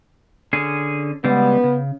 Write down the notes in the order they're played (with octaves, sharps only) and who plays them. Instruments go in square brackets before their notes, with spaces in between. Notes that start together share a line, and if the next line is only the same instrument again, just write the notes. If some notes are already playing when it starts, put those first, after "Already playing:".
[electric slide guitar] D3 C#4 G#4
[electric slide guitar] C#3 G3 G#3 [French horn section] B3
[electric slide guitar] C#3